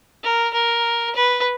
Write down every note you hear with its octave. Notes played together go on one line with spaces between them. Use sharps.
A#4
A#4
B4